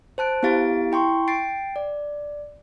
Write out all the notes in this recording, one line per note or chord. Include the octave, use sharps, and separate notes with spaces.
C5 A5 F#6 D7
B3 E4 G4 F5 A6 D7
E4 G5 C6 C#6
G5 A6 C7 D7
D5